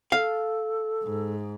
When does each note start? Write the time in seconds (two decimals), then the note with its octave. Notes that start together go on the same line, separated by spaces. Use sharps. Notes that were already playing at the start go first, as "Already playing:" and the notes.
0.12 A4 F5
1.03 G#2